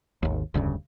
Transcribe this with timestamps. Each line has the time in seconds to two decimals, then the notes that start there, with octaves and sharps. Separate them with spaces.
0.23 G#1 D#2
0.54 E1 D2 G2 C#3